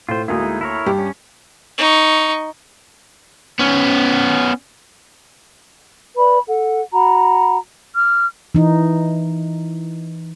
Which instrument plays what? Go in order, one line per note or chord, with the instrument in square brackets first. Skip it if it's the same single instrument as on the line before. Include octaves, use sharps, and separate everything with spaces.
[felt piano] A2 [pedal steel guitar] F4 C5
[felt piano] D2 A#3 [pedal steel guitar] G#3 D#4 E4
[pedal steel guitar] E4 A#4 C#5
[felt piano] G2 G4
[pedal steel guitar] C#4
[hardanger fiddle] D#4 C#6
[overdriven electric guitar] B3 C#4
[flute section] B4 D5 B5
A4 F#5
F#4 F#5 A#5 B5
D6 F6
[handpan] E3 D#4